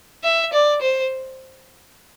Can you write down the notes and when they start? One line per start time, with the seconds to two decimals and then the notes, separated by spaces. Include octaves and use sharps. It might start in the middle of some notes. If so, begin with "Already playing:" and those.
0.24 E5
0.53 D5
0.82 C5